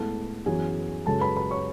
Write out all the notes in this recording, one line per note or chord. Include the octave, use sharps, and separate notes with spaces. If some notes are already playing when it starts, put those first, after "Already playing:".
Already playing: A2 G#3 B3 E4 A4 A5
F#2 E3 B3 G#4 G#5
F#2 C#3 G#3 A4 A5
B4 B5
B4 B5
C#5 C#6